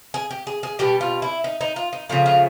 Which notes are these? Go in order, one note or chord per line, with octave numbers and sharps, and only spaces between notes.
G#4
G4
G#4
G#4
B2 G3 G4
F4
E4
D#4
D#4
F4
D#4
C#3 F3 A3 F4
F4